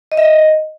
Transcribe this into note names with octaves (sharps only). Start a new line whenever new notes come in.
D#5
E5
D#5